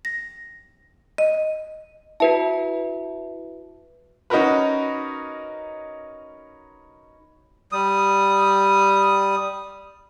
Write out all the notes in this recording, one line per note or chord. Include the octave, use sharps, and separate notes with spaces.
A#6
D#5
E4 F#4 B4 E5 A5
C#4 D#4 F#4 A#4 B4
G3 D#6